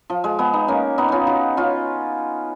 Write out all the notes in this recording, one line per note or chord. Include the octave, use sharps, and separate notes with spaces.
F3
G#3
G#3 B3
B3 D#4
A#3 C#4
B3 D#4
C#4 D#4 F4
D#4 F#4
C#4 F4